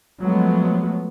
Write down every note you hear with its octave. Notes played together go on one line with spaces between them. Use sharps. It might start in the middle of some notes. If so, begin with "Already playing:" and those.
F3 F#3 G#3 A3 B3